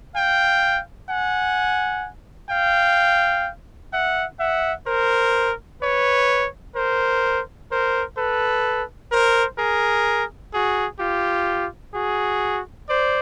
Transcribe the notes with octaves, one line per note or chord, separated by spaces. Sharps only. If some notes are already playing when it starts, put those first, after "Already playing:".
F5 G5
F#5 G#5
F5 G5
E5 F#5
E5 F#5
A#4 C5
B4 C#5
A#4 C5
A#4 C5
A4 B4
A#4 C5
G#4 A#4
F#4 G#4
F4 G4
F#4 G#4
C5 D5